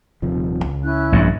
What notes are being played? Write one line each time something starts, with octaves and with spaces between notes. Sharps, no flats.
D#1 C3 F3
C#2
C#4 E4 F#6
A#1 G2